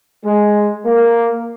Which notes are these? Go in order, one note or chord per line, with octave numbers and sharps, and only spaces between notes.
G#3
A#3